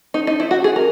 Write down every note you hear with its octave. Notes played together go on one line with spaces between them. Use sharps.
D#4
D#4
E4
F#4
G#4
A#4